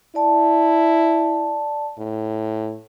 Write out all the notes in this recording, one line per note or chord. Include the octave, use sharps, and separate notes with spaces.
E4 D5 A5
A2